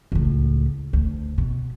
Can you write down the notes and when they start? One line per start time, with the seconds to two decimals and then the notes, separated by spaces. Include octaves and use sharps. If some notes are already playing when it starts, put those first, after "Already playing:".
0.12 C#2 A2
0.93 D2
1.38 B2